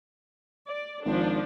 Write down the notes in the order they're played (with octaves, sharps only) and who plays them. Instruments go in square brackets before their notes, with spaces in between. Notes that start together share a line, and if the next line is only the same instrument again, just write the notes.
[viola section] D5
[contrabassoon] G#1 [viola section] F3 D4